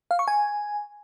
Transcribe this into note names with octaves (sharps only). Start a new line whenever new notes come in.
F5
C#6
G#5